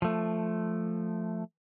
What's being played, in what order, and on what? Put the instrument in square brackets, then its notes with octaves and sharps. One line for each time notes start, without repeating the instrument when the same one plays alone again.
[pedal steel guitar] F3 A3